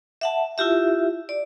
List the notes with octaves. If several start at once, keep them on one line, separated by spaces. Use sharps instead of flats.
E5 F#5 A5
E4 F4 G4 E5
D5